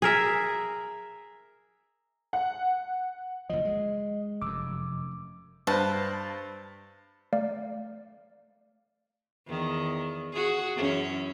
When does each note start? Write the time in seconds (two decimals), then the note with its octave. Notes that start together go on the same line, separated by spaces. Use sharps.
0.02 G#4 A#4 E5
2.33 F#5
3.50 F#1 D2 F3 D#5
3.65 G#3
4.42 F1 F#2 D6 E6
5.67 G2 B4 C5 A5
7.33 A3 D5 F5
9.47 E2 D#3
10.33 F#4 G#4
10.76 F#2 E3 C#4